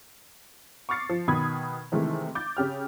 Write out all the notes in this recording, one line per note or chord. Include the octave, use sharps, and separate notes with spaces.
C#6 D6 F6 A6 C7 C#7
F3
B2 D#3 B5 D#6 G#6
C3 D#3 E3 G#3 A3
D6 G6 A6
C#3 G4 F6